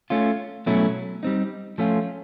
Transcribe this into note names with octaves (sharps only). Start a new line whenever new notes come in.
A3 C#4 F4
B2 F#3 A3 C#4 E4
G3 C4 D#4
F3 A3 C#4 F4